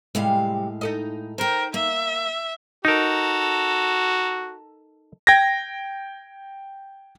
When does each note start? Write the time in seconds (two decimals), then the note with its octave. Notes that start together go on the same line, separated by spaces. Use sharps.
0.15 A2 C3 G3 G#3 F5
0.81 D#4 A4 D#5
1.38 A#4 C5 G5
1.74 A#3 E5
2.85 D#4 F#4 A4 A#4 A#5
5.27 G5 G#6 A#6